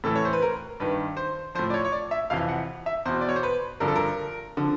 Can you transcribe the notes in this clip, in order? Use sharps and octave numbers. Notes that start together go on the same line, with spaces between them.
A2 E3 A4
C#5
C5
B4
A#4
G2 D#3 B4
C5
A2 F3 C5
D5
C#5
C#5
D5
E5
F2 C3 E3 F5
F#5
E5
E2 B2 C5
D5
C#5
C5
B4
G2 D3 F3 A#4
A4
A#4
D3 F3